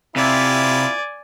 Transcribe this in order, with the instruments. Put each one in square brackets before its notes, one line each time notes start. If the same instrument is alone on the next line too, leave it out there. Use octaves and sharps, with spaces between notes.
[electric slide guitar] C3 [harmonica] E4 F4 [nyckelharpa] D5 G#5